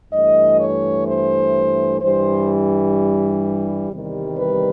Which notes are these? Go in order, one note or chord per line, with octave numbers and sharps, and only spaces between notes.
G2 E3 A3 D#5
C#5
C5
G2 E3 G3 C5
E2 C3 D#3 G3
B4